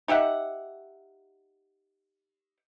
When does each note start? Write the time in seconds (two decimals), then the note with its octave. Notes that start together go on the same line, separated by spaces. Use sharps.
0.08 D#4 G4 E5 F#5